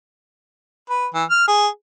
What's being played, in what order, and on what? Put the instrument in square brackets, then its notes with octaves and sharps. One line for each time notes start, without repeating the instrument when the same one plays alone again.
[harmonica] B4
E3
F6
G#4